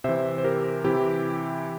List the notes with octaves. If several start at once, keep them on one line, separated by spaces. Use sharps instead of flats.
C3 E3 C5 E5
C5
G4 A#4
C3 E3 E4 G4